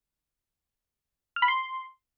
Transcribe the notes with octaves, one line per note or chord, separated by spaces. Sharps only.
F6
B5
C6